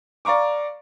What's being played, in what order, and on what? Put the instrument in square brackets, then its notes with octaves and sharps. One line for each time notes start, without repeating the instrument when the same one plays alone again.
[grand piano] D5 F5 A#5 C#6 D6